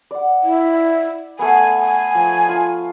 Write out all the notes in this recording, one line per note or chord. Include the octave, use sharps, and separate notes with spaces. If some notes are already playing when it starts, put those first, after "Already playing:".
D5 F#5
E4
A3 B3 G#5
G#5
F3
F4 A5